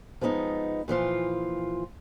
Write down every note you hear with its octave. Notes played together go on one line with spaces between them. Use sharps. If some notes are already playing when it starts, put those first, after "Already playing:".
F3 G#3 B3 C4 D#4
A#2 E3 F3 F4